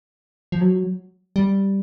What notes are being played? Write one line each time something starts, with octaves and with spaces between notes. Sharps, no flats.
F3
F#3
G3